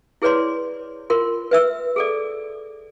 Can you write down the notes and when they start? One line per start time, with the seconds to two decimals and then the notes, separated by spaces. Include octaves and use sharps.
0.22 E4 G#4 B4 C#5 D5 C6
1.10 F4 A#4 C6
1.51 B4 E5 E6
1.96 G#4 A4 D5